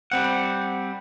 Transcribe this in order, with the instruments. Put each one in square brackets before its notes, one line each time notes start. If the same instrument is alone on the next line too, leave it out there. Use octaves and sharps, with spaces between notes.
[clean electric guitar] G3 C4 F#5